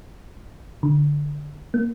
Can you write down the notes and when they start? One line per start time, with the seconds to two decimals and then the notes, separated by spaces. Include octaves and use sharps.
0.83 D3
1.74 A#3